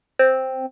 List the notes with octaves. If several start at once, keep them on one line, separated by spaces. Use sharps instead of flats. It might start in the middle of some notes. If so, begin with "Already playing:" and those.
C4